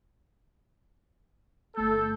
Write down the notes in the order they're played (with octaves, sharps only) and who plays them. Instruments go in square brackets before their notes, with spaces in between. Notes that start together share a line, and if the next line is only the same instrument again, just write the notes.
[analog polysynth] G1 A3 G6 [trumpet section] A4